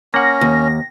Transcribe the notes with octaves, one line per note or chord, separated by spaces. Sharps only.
A#3 C#4 F#5 A#6
D#2